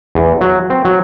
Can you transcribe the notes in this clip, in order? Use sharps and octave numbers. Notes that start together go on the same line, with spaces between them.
E2
F#3
C4
F#3